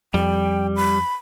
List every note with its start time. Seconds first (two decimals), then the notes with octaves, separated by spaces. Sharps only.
0.14 F2 G3 G5
0.76 B5